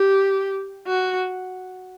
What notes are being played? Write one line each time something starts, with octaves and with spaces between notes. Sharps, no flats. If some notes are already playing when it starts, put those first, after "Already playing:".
Already playing: G4
F#4